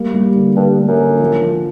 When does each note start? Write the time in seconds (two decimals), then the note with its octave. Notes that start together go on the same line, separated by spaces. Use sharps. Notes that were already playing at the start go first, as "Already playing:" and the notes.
Already playing: G3 A#3
0.14 G3
0.35 D3
0.56 G2 D3
0.78 G3
0.88 F#2
0.99 D3
1.19 F3
1.41 F3